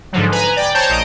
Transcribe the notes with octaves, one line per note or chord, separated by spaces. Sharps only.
G#2 D3 F3 F#3
B4 G#5 A#5
D5 G5
C5 C#5 A5 A#5 G6
A#1 D#5 D7